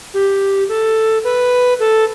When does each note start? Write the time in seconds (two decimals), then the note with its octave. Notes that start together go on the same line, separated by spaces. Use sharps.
0.14 G4
0.69 A4
1.24 B4
1.80 A4